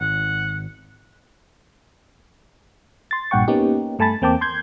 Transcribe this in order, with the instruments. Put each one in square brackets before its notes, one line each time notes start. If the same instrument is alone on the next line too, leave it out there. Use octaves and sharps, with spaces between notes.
[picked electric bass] G#1 [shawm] F#5
[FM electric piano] C6 A6
A#1 G2 A#2 F#5 G5 C#6
A#3 B3 C#4 D#4 G4
G2 A3 G#5 A5 B5 A6
E2 A#3 C4 G5 A5 D6
C6 G6 G#6